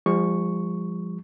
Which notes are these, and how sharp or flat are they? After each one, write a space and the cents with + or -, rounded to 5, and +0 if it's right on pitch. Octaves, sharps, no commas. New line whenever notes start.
F3 +0 G#3 -45 C#6 +0